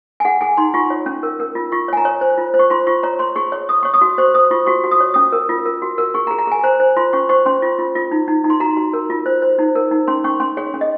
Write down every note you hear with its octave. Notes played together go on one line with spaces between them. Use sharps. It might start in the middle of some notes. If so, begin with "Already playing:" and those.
G#5
G#4 F#5
G#4 G#5
D#4 C6
F4 C#6
C#5
C#4
A#4
A#4
F4
F4 C#6
C#5 G#5
A#5
C#5
C5
F4
C5
C#6
F4 C6
F4 C#6
C#5 A#5
C#5 C6
G#4 C#6
C#5
C#5 D#6
C#5 C#6
D#6
F#4
C5 C#6
C5 D#6
F4 C#6
F#4 C#6
F#4
D#6
C#5
C#4 D#6
A#4
F4
A#4
F#4
A#4
G#4 C#6
A#5
G#4
A#5
G#4 G#5
C5 A#5
C5
F4 C6
C#4 C#6
C5 C#6
C#4 C6
F4
F4
F4
D#4
D#4
D#4
C6
F#4 A#5
F#4
A#4
F4
C5
C5
D#4
A#4
D#4
C#4 C6
C#4 C#6
C#4 C6
G#4 C#5
C#4
D#5